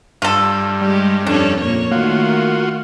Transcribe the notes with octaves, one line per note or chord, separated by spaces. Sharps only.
G2 F4 A4
G3 G#3 G4
F2 C#4 D4 A4 C#5
A#2 A#3 C#5
D#3 A3 A#3 F4 F#4